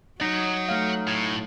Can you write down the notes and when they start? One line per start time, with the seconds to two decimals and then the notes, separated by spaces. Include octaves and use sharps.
0.21 F#3 D#4 F#5 A#5
0.69 A3 F5
1.07 A2